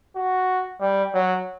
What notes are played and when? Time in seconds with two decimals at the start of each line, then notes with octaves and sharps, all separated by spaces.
0.16 F#4
0.80 G3
1.14 F#3